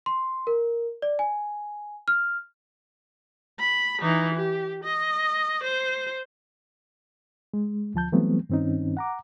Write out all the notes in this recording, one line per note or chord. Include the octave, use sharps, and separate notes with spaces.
C6
A#4
D5
G#5
F6
B5
E3 D#4
G4
D#5
C5
G#3
D2 F3 A5 G6
E3 F#3 G3 A3 B3 C4
G2 D#3 C4 C#4 D#4
F#5 A#5 D6